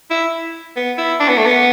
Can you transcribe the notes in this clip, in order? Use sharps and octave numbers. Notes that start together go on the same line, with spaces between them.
E4
B3
E4
D4
B3
A3
B3